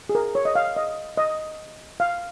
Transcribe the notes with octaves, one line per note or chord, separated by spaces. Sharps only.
G#4
A#4
C#5
D#5
F5
D#5
D#5
F5